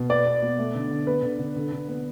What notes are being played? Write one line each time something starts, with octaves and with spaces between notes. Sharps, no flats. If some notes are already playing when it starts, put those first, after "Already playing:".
Already playing: B2
B3 D5
B3
B2
A3
D3
D3
B3 B4
D3
D3
D3
D3
B3